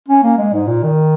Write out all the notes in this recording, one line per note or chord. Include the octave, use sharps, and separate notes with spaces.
C#4
A#3
G#3
G#2
A#2
D#3